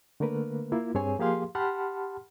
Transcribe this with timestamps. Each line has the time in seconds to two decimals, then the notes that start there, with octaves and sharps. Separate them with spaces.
0.20 D3 A3 A#3 A#4 B4
0.72 A#3 E4 F4
0.95 G2 C4 G#4 C#5 G#5
1.19 F3 A#3 G4 G#4 F5 C6
1.55 G4 F#5 A5 B5 C6 F6